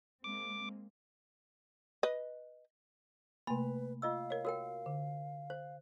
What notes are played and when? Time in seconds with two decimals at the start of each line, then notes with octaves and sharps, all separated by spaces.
0.24 G#3 A#3 C4 D6
2.03 B4 D#5
3.47 C3 A3 A#3 B4 B5
4.02 F4 D#5 F5 E6
4.30 A#4 C#5
4.45 F#4 A#4 C#5 G5 D#6
4.86 D3
5.50 C5